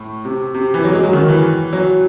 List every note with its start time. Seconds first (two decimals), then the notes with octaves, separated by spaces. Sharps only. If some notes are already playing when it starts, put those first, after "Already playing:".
Already playing: A2
0.25 C3
0.54 C3
0.74 E3
0.84 F#3
0.93 G#3
1.04 F#3
1.13 D#3
1.28 E3
1.73 F#3